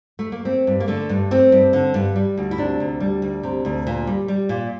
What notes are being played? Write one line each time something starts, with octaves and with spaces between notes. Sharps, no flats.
A3
A#3
A3 C4
G2
A#3
D3 A3
G2
A3 C4
G2
D3
G2
G3
D2
E4
C3 D4
D2
G3
D2
C3
D2
A#2
G3
G3
A#2